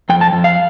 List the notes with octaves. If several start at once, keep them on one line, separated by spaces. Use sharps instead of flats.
F2 G5
A5
F2
F5